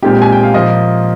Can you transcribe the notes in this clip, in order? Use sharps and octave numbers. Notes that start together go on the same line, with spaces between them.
A#2 G#3 C4 D#4 G4
G#5
G5
F5
A#2 F3 A#3 F4 D#5